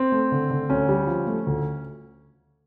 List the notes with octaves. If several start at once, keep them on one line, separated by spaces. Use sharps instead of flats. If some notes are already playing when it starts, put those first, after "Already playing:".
Already playing: C4
A3
D3
D3
D2 C#4
G3
F3
A3
D2